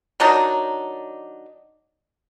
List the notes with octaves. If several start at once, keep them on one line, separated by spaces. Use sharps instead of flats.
D#3 F#3 D4 D#4